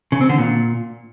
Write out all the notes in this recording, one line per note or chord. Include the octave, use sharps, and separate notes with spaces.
C#3
C4
D3
A#2